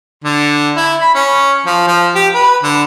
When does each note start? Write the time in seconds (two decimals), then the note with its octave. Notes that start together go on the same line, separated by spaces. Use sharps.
0.24 D3
0.77 E4
1.01 B5
1.15 C#4
1.66 F3
1.87 F3
2.15 G4
2.34 B4
2.63 D3